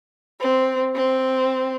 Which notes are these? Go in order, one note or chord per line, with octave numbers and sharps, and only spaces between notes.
C4
C4